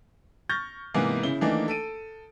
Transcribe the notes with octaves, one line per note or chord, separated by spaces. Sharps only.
C#6 F6 G6 A6 A#6
G#2 C3 E3 A#3 B3
C#3 E4 G7
D#3 E3 A3 A#3 D4 D#4
A4 D7 D#7